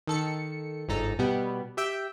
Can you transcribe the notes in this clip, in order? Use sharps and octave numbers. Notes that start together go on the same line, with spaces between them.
D#3 A4 C#7
G1 G#2 D#4 A4 A#5
B2 G3 B3
G4 E5 G5